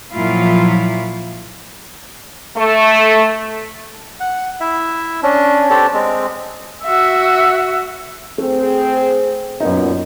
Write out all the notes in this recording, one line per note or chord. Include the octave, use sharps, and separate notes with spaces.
A#2 F3 F#3 E4 F4 F5
A3
F#5
E4 E5
C#4 D4
C4 D4 G4 A4
G#3 C4
F#4 E5
A3 C4 G#4
F#2 A#2 B3 D#4